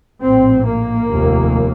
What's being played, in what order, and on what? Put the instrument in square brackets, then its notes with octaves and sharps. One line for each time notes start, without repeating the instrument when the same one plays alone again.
[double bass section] A#1 A2 C4
A#3
F1 D#2